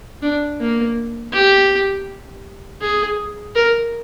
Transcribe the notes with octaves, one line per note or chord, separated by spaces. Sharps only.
D4
A#3
G4
G#4
A#4